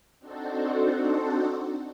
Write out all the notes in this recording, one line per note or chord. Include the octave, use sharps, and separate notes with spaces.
C4 D4 D#4 F#4 A4 C5